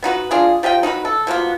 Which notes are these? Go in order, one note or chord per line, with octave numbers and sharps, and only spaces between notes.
B3 D#4 F#4 B4
D4 F4 G#4
F3 G4 D#5 G5
D#4 F#4 A4 B4
A4
B2 F3 A#3 B3